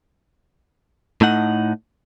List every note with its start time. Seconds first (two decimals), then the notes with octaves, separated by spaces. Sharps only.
1.21 A2 A3 D#4 F#5